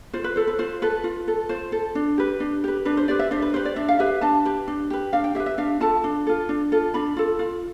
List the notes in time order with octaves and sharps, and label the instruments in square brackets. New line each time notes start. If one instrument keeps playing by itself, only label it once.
[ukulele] F4 C5
B4
A4 C5
B4
F4 C5
A4 B4
F4
A4
F4 C5
A4
D4
G4 B4
D4
G4 B4
D4 B4
C5
G4 B4 D5
E5
D4 C5
B4
G4 B4 C5
D5
D4 E5
F5
G4 B4 E5
D4 A5
G4 B4
D4
G4 B4
D4 F5
G5
G4 E5
B4
E5
D4 F5
F4 A4 A5
D4
F4 A4
D4
F4 A4
D4 B5
F4 A4
F4